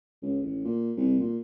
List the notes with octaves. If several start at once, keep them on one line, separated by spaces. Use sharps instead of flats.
C#2
A1
A#2
C2
A#2